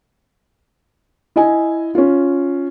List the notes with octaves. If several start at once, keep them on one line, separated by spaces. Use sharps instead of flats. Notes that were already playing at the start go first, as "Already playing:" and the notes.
E4 D#5 G#5
C#4 F4